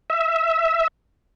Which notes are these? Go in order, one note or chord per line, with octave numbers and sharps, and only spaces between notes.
E5